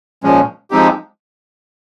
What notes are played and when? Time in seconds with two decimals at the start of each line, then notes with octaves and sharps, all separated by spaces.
0.23 A#2 F3 G#3 C#4
0.71 F3 G#3 C4 D#4 G4